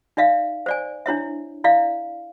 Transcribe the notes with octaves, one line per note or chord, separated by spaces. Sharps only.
D#4 D5 E5 F5
C5 D5 G#5
D4 E4 C#5 E5
E4 D5 E5 F5